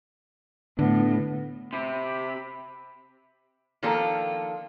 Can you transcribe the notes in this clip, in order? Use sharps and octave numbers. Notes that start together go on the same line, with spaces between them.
A2 D3 B3
C3 B5
D#3 F3 A#3 D4 F4 A4